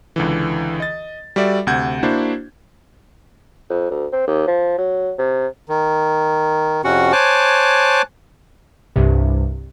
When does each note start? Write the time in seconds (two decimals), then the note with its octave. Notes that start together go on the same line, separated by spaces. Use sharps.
0.16 C#2 D3 E3
0.80 D#5 A6
1.36 G3 F#4 A4 D5 E5
1.67 D2 C3 F#5 G6 G#6
2.03 A#3 D4 E4 F#4 C5
3.70 F2
3.91 D2
4.12 C4
4.27 D#2
4.47 F3
4.78 F#3
5.18 C3
5.69 D#3
6.84 F2 C3 C#4 F#4 F#5
7.12 C5 C#5 G#5 A5 D6 F#6
8.96 C2 G2 C3